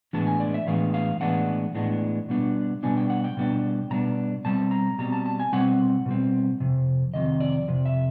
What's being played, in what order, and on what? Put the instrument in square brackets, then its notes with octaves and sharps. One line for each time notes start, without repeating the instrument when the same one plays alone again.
[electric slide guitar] A2 E3 G#3 B3 D4 A5
G#5
D5
E5
A2 E3 G#3 B3 D4 F5
F5
A2 E3 G#3 B3 D4 F#5
A2 E3 G#3 B3 D4
B2 G3 B3 D4
B2 G3 B3 D4 G#5
G5
F#5
G5
B2 G3 B3 D4
B2 G3 B3 D4 A#5
B2 G3 C4 A5
A#5
B2 G3 C4 A#5
A5
A5
G#5
B2 G3 C4 F#5
B2 G3 C4
F2 C3
F2 C3 D#3 D#5
D5
F2 C3
E5